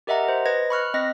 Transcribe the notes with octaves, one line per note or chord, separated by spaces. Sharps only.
G4 A#4 D#5 E5 F#5 A#5
C5
B4 D#5 G#6 A#6
B5 C#6 F6 F#6
C4 D#5 A#6 B6